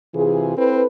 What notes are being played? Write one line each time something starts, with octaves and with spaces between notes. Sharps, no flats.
C3 E3 F4 G#4
C4 E4 A4 B4